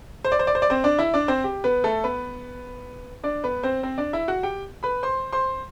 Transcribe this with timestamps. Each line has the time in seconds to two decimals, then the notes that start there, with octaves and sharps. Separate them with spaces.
0.25 C5
0.32 D5
0.39 C5
0.47 D5
0.55 C5
0.62 D5
0.70 C4 C5
0.84 D4 D5
0.99 E4 E5
1.14 D4 D5
1.28 C4 C5
1.44 G4
1.64 B3 B4
1.84 A3 A4
2.04 B3 B4
3.24 D4 D5
3.44 B3 B4
3.63 C4 C5
3.83 C4 C5
3.98 D4 D5
4.13 E4 E5
4.28 F#4 F#5
4.43 G4 G5
4.83 B4 B5
5.03 C5 C6
5.33 C5 C6